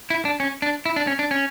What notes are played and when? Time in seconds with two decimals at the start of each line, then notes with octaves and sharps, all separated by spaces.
0.10 E4
0.25 D4
0.40 C#4
0.62 D4
0.86 E4
0.96 D4
1.07 C#4
1.19 D4
1.31 C#4